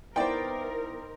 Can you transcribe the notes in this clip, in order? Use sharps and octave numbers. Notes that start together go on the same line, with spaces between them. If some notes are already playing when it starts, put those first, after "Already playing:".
B3 D#4 E4 A#4 C5 D5 G5